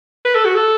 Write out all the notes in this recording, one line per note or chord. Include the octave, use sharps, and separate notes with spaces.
B4
A4
F#4
A4